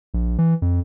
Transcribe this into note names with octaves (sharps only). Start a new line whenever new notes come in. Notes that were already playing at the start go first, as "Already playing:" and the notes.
A#1
E3
F2